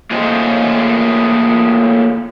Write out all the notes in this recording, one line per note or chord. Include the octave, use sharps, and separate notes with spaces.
A3 A#3 F4 G#4 C5 D#5